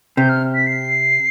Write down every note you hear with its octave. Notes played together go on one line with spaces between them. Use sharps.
C3 G6
F6
B6
C7